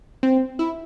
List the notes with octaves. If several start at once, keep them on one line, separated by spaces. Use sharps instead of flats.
C4
E4